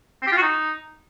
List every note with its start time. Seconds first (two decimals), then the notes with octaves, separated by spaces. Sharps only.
0.22 C4
0.27 G4
0.32 F4
0.37 F#4
0.42 D#4